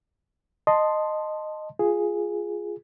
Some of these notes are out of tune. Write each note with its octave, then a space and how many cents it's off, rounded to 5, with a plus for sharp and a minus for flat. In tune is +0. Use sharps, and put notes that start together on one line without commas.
D#5 -10 A5 +0 C6 +0
F4 +0 G#4 +0